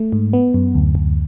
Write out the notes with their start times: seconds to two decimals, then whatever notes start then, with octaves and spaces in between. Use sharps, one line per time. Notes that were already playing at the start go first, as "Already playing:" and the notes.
Already playing: A3
0.12 G#2
0.33 B3
0.54 F#2
0.75 D2
0.95 D2